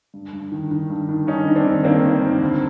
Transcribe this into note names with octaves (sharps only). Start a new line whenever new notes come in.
G2
G2
D#3
D#3
G2
D#3
G2 C#4 D#4
D#3
C4 D4
D#3
D#3 A#3 C4
D#3
G2
D2